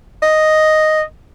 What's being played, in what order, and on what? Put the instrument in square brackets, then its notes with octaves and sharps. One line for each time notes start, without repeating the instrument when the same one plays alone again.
[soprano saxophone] D#5